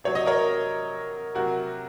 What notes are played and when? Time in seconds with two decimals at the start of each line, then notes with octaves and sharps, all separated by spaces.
0.04 C3 F#3 C#5
0.15 D#5
0.26 A#4 C#5
1.35 C3 F#3 F#4 A#4